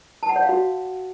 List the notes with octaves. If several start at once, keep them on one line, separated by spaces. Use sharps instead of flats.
A5
F#5
C#5
F5
F#4